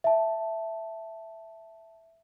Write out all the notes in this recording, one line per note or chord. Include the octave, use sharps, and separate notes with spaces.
E5 A5